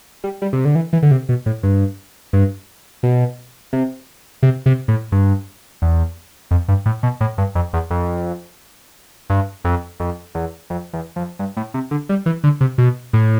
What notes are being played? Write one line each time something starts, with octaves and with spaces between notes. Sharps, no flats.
G3
G3
C3
D3
E3
E3
D3
C3
B2
A2
G2
G2
B2
C3
C3
C3
A2
G2
E2
F2
G2
A2
B2
A2
G2
F2
E2
F2
G2
F2
F2
E2
F2
E2
F2
G2
A2
C3
D3
G3
E3
D3
C3
B2
A2